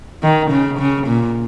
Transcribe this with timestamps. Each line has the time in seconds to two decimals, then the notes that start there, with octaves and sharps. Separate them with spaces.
0.23 D#3
0.51 C#3
0.79 C#3
1.07 A#2